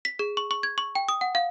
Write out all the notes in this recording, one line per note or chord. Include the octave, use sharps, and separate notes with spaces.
B6
G#4
C#6
C#6
G#6
C#6
G5
D#6
F#5
F5